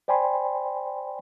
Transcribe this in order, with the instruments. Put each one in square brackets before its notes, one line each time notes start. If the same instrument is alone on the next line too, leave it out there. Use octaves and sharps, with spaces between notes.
[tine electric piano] C5 D5 G5 G#5 B5 C6